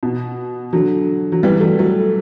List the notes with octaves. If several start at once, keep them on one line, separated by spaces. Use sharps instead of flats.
B2
D3 F#3
F#3
E3 G3
F#3 A3
F#3 A3